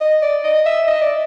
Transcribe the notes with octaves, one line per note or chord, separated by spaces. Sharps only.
D#5
D5
D#5
E5
D#5
D5